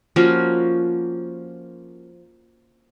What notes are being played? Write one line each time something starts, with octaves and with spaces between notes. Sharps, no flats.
F3 A#3 C#4 F#4